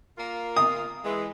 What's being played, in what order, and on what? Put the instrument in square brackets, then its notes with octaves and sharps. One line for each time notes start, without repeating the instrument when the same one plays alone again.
[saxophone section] A#3 F4 A#4
[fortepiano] D#6
[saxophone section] E3 G#3